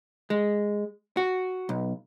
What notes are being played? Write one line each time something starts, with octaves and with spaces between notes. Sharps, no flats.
G#3
F#4
B1